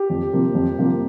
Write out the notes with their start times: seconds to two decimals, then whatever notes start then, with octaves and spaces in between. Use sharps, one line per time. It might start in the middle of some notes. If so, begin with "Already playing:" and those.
Already playing: G4
0.10 F2
0.33 C3 F3 A#3
0.55 F2
0.79 C3 F3 A#3